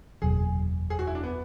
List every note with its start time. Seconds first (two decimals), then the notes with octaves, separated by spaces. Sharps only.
0.22 F#1 E2 B2 F#3 G#4
0.90 G#4
0.99 F#4
1.07 E4
1.15 D4
1.23 B3